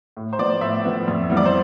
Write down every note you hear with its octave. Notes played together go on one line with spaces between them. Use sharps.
A2
C5
F3 B3 D5
A2 E5
F3 B3
F2
E3 G3 B3
D5
C5